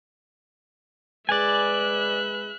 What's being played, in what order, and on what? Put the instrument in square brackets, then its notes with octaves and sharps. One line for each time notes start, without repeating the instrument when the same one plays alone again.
[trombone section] G#3 G#4 B4 [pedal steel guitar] D5 G#5 [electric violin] E5 F#6